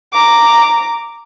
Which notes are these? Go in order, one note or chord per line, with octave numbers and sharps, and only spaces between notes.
A#5 D6